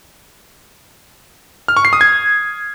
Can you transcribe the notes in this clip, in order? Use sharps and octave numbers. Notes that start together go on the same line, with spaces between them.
F6
C#6
C7
D#6
G#6